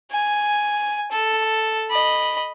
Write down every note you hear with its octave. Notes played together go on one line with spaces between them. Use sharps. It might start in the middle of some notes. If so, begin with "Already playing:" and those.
G#5
A4
D#5 B5